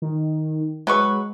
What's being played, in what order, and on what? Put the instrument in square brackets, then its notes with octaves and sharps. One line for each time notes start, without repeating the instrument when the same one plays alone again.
[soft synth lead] D#3
[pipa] F#3 B4 C#6 [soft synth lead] G#3